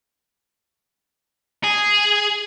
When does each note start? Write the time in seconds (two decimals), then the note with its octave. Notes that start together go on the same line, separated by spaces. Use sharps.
1.64 G#4